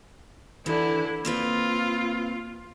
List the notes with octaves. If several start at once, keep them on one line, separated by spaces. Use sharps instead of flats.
D3 E3 E4
A#3 C4 F4 B4